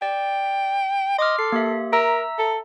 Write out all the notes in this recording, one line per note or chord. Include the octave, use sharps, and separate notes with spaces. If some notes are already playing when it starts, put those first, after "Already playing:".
D5 G5
D#5 C6 D6 F6
A4 C7
A#3 G4 E5
A#4 E5 A#5 E6
A4